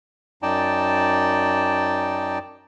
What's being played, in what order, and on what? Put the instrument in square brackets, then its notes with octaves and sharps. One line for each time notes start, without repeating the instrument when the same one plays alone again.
[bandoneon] F#2 D#4 D5 G5 A5